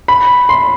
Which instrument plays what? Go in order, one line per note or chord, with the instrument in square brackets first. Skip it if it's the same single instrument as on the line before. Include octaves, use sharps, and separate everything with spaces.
[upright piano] B5
C6